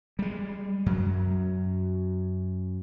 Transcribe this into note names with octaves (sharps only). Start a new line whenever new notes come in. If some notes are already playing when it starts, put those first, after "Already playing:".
G3 G#3
F#2 F#3